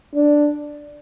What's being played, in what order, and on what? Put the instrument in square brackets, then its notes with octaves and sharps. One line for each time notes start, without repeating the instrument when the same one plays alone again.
[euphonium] D4